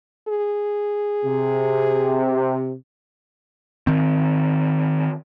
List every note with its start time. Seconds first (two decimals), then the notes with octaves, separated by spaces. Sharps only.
0.28 G#4
1.25 C3
3.87 D#3 C4